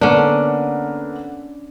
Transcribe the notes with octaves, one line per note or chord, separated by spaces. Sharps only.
D3 A#3 B3 C#4 D4